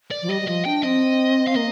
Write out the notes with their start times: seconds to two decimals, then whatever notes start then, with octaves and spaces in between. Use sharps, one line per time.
0.11 D5
0.22 F3
0.29 G3 D#5
0.42 G3
0.47 F3 D#5
0.65 D4 G5
0.83 C4 D#5
1.48 F5
1.56 A#3 D#5